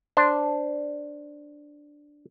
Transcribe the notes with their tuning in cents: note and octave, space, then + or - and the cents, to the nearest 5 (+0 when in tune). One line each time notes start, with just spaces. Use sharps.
D4 +0 C5 +0